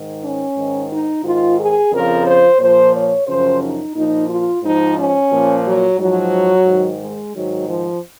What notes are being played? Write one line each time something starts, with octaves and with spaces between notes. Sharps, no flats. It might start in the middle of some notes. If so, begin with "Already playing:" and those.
Already playing: G#2 D#3
C#4
G#2 D#3
D#4
G#2 D#3 F4
G#4
F2 C#3 F3 A#4
C5
A#2 F3 C5
C#5
F#2 C#3 F3 C5
D#4
A#2 F3 D#4
F4
G#2 F3 D#4
C#4
A#2 F3
F#3
G#2 F3 F#3
G#2 D#3
G#3
G#2 D#3 F#3
F3